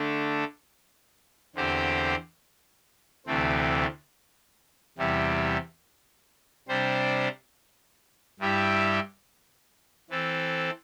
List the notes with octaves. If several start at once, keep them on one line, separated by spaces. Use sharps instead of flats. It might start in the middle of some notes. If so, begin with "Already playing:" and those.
Already playing: D3 A3 D4
E2 D3 C4 G4 C5
D2 C3 E3 A3 C4
E2 C3 G3 E4
C3 G3 D4 C5
G2 G3 E4 G4 E5
E3 C4 A4